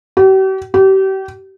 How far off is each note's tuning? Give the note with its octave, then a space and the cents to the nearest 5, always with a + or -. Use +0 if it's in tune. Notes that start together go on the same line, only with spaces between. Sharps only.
G4 -45
G4 -35